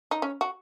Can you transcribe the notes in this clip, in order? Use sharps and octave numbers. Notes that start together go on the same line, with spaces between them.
D#4
C#4
F#4